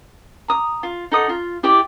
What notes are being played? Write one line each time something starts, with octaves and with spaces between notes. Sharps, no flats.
A#5 D#6
F4
D#4 A4 F#5 D#6
F4
E4 G4 D5 D6